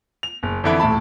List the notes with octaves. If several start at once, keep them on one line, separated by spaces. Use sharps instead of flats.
F7
F#1
F2 D3 E3 E4
D#1 A2 E5 A5 B5